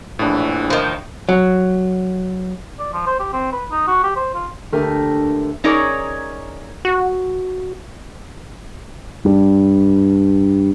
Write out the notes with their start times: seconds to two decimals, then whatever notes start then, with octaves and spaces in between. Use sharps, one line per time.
0.19 A#1 E2 A2 E3 D4
0.70 D#3 F3
1.29 F#3
2.79 D5
2.93 F3
3.06 C5
3.20 G4
3.33 C4
3.52 B4
3.71 D#4
3.87 F#4
4.03 G4
4.16 C5
4.34 F4
4.72 D2 A3 G4 A#4 B6 D#7
5.64 C#4 D#4 G#4 A#4 C#5 D5
6.85 F#4
9.25 G2